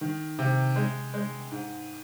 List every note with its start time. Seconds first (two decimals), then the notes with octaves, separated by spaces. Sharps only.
0.01 D#3
0.39 C3
0.76 G#3
1.14 G#3
1.51 G#2